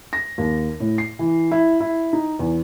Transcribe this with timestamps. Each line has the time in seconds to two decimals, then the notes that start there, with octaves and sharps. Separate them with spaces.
0.13 A#6
0.38 D#2
0.80 A2
0.98 C7
1.19 E3
1.51 E4
1.80 E4
2.13 D#4
2.39 E2